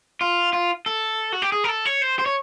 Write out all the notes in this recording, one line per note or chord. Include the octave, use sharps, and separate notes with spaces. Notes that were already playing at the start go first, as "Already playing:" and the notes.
F4
F4
A4
F#4
G4
G#4
A#4
A4
C#5
C5
C5
C#5